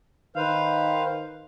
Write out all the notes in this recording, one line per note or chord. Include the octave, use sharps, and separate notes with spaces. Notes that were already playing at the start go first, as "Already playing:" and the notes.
D#3 B4 C5 F5